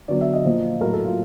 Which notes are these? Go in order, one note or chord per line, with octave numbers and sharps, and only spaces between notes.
D3 F#3 B3 D4 D5
E5
D#5
A#2 F3 A#3
A2 F#3 A3 A#4
A4
F4